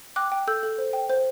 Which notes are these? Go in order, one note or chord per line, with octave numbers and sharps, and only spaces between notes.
G5 D6 F#6
G5
A4 E6 G6
A4
C5
G5
C5